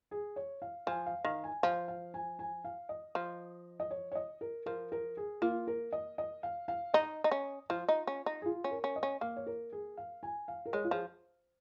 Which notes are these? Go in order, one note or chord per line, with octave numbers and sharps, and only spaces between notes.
G#4
C#5
F5
F3 G#5
F5
D#3 F5
G#5
F3 F5
F5
G#5
G#5
F5
D#5
F3
D#5
C#5
C#5
D#5
A#4
F3 A#4
A#4
G#4
A#3 F4
A#4
D#5
D#5
F5
F5
D#4 D#5
D#4
C#4
F3 F4
D#4
C#4
D#4
G#4
F4
C#4
A#4
C#4
D#5
C#4
A#3 F5
C#5
A#4
G#4
F5
G#5
F5
A#4
G#3 C#5
F4
F3 G#4